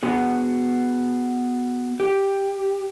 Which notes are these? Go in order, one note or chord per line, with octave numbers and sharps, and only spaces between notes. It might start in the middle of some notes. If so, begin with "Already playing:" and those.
B3 F#4 G#4
G4